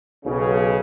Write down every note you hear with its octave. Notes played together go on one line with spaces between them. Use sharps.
B1 C#3